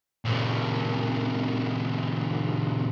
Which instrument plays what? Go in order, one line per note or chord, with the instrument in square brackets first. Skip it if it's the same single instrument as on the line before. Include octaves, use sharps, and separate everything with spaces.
[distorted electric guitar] A#2 C#3